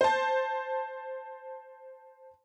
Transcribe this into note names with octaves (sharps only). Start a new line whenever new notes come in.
C5 A5